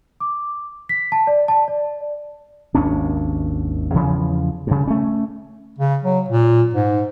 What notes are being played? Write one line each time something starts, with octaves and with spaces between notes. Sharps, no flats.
D6
B6
A5
D5
A5
D5
G#1 D#2 C#4 D4
E2 C#3 F3
G2 C#3
A3 C#4
C#3
F#3
A#2
G#2